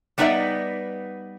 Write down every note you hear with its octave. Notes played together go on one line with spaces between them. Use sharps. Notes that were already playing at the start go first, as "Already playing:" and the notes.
G3 B3 D#4 B4 D5 E5